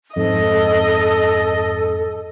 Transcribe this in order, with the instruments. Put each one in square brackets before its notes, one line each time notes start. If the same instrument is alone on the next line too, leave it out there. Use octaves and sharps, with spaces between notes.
[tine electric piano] F2 G#2 [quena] A4 [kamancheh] D#5